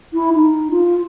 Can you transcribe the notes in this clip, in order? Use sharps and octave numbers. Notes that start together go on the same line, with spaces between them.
E4
D#4
F4